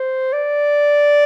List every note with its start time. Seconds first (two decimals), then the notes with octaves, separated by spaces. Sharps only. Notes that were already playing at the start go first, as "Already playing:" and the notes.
Already playing: C5
0.33 D5